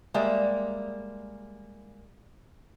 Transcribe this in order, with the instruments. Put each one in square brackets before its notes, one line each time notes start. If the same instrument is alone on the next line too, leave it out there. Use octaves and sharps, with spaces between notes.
[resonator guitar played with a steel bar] G3 G#3 A#3 D5 E5